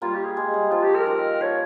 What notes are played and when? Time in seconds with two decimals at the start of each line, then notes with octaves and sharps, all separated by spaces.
0.02 G3 A#3 F4
0.14 G4
0.25 G#4
0.37 G#3
0.54 G3
0.71 F3 F4
0.83 G4
0.95 A#4
1.06 D#3
1.41 F3 C#5